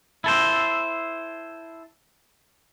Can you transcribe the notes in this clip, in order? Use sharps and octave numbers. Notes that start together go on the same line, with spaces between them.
E4 A4 C5